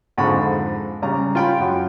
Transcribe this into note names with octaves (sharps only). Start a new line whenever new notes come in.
F2 G#2 D3 B5 C#6
C#3 G3 A#5
F4 G5 B5
F#2